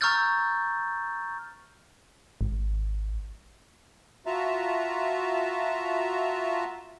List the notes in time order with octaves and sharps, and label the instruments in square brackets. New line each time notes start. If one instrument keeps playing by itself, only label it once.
[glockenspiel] A#5 C#6 E6 F6 G6 A6
[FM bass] G#1
[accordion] F4 F#4 E5 A5 A#5